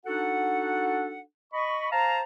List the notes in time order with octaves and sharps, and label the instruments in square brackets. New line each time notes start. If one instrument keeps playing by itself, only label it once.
[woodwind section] D4 D#4 F#4 A4 F#5
D#5 B5 C#6
C5 F5 A5 A#5